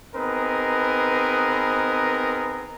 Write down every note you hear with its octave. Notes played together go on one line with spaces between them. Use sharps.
B3 C4 D#4 G#4 A#4 B4